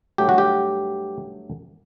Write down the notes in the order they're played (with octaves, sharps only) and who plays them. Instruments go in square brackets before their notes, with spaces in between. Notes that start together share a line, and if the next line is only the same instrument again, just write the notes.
[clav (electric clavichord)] G2 F#3 A3 G4
F#4
G4